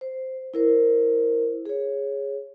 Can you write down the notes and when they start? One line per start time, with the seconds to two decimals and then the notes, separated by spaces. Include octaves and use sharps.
0.01 C5
0.54 E4 A#4 C5
1.66 G#4 C#5